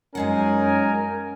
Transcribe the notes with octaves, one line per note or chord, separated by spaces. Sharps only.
F#2 G#3 C#4 D#4 A#4 F#5 G#5